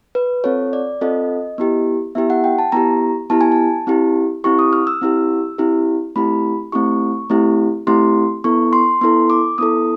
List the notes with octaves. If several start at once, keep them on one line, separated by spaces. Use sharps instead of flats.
B4
C4 F4 A4 C#5
D5
C4 F4 A4 D#5
B3 E4 G4
B3 E4 G4 E5
F#5
G5
A5
B3 E4 G4 A#5
B3 E4 G4 A5
G#5
A5
C4 E4 G4
C4 E4 G4 C#6
D#6
F6
E6
C4 E4 G4
C4 E4 G4
A3 C4 E4 G4 B5
A3 C4 E4 G4 C#6
A3 C4 E4 G4
A3 C4 E4 G4 C6
B3 E4 A4 C#6
C6
B3 E4 A4 C6
D6
B3 E4 A4 D#6